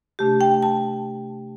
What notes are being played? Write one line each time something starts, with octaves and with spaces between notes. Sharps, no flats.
C3 A3 D4 G4
G5
A5